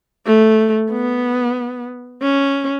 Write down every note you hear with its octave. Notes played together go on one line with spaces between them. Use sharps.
A3
B3
C#4